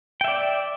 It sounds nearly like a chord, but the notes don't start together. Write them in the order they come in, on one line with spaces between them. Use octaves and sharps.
G5 E5 D5